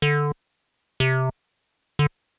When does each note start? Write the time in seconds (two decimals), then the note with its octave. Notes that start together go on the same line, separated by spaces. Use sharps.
0.02 D3
1.00 C3
1.99 D3